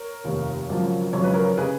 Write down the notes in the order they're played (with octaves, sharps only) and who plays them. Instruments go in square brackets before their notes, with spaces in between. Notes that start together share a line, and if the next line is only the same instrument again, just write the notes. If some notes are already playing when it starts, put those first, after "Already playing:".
Already playing: [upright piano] A#4 C#5
F1 D#2 D#3
G#1 F#2 C#3 F3
G#1 F#2 C#3 F3 C#5
B4
A#4 C#5
C#3 G#4 B4